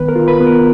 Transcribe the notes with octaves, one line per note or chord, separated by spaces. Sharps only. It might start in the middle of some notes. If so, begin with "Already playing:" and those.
Already playing: D#3 B3 B4
A#4
F4
B4
B3
A#4